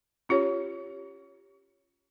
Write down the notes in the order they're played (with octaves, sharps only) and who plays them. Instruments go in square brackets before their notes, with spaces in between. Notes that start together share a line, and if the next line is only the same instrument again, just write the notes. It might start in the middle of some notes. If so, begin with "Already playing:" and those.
[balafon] C#4 F4 G4 C#5